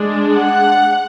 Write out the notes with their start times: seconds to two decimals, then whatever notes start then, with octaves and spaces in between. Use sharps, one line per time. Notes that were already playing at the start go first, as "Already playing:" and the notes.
Already playing: G#3 D4
0.34 F#5